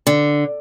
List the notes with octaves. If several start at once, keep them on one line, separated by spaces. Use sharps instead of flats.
D3